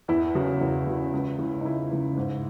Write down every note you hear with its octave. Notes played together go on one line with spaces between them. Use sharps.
E2 E4
C#3 F#3
E2
C#3 F#3
C#2
C#3 E3
D#4
C#2 E4
C#3 E3
G#2